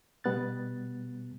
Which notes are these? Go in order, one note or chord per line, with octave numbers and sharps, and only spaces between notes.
B2 G3 B3 F#6 A6